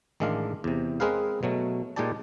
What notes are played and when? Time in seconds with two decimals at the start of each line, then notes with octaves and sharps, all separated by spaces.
0.20 A1 D#3 G#3 D4 F5
0.64 E2 C3
1.00 G#3 C4 G#4 A#4 B4 F5
1.43 B2 F#3 A3
1.96 A#2 G#3 D#4 G4 D5 A5